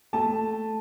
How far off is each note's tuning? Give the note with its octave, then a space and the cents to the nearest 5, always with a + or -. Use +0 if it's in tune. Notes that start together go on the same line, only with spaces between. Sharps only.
A3 -5 A5 +0